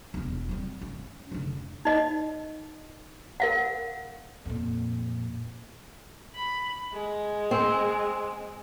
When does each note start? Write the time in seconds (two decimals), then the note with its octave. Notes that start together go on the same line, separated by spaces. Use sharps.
0.14 E1 E2
0.49 G3 C4
0.81 C#4
1.32 F1 D3
1.85 D#4 D#5
3.40 A#4 F5 F#5
4.45 F2 A#2
6.35 B5
6.93 G#3
7.51 C4